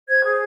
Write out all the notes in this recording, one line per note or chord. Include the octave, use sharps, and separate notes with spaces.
C5 G#6
G#4